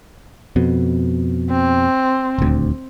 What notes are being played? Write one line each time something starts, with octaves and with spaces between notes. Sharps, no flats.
F2 B2
C4
D#1 D2